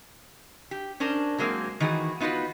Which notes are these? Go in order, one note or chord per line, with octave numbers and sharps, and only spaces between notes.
G4
C#4 D4 A#4 C5
F#3 G#3 A#3 C4
D#3 E3 F#4 G#4
B3 D#4 F4 F#4 B4